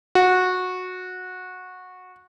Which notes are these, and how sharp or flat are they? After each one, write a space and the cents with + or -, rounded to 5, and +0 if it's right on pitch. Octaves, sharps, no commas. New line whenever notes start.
F#4 -15